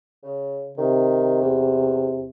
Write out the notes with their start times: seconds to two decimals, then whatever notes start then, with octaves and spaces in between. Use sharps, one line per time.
0.23 C#3
0.78 C3 D#3
1.41 E2